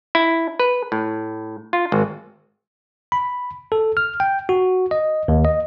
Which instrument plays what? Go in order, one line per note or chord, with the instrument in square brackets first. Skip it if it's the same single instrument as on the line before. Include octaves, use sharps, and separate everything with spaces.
[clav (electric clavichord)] E4
B4
A2
F4
G#1
[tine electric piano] B5
A4
F6
G5
F#4
D#5
D#2
D#5